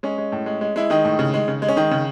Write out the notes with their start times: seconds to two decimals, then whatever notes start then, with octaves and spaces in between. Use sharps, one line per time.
0.03 G#3 C#4
0.18 G#3
0.32 A2
0.46 G#3
0.61 G#3
0.76 G#3 E4
0.90 D#3 G#3 D#4
1.05 A2
1.19 C#3
1.34 G#3
1.48 C#3
1.62 G#3
1.68 C#4
1.76 D#3 G#3 D#4
1.91 C#3